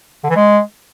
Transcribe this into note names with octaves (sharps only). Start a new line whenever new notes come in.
D3
E3
G#3